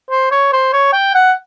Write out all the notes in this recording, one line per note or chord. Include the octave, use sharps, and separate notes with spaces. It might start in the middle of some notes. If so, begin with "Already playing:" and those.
C5
C#5
C5
C#5
G5
F#5